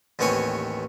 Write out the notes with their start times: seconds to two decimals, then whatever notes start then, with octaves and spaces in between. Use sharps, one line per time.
0.19 A1 D#2 B3 C4 C#5 G#5